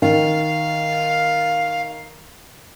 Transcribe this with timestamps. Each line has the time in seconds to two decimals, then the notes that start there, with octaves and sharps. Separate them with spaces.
0.02 D#3 F5